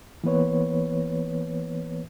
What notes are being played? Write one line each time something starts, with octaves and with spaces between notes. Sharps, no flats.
E3 A#3 B3 B4 C#5